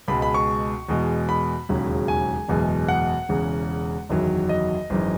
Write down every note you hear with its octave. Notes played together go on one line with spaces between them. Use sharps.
C#2 B2 G#3 B5
B5
C#6
E2 B2 G#3
B5
E1 D#2 C#3 F#3
G#5
F#1 E2 B2 G#3
F#5
E1 E2 C#3
F#1 E2 D#3 F#3
D#5
G#1 F#2 E3 G#3